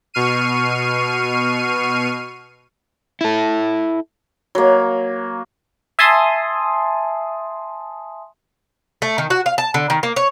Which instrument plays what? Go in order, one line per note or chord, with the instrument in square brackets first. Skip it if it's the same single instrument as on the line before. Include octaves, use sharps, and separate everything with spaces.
[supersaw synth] B2 C#6 F6 C7 D#7
[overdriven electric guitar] E4 A4
[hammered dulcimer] F#3 A#3
[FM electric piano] E5 G#5 A5 C6 D#6
[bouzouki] A3
D#3
F#4
F5
A5
D3
D#3
A#3
C#5